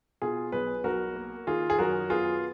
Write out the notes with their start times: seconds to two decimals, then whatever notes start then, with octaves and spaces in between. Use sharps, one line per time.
0.22 B2 F4 G#4
0.52 B1 G#4 B4
0.84 B1 F#4 A#4
1.16 A#3
1.47 D#3 F4 G#4
1.70 G#4
1.78 F#2 F#4 A#4
2.10 B3 F4 G#4